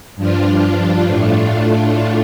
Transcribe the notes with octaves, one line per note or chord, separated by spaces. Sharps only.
G2 F3 D4 F4
A2 A3 D4 F4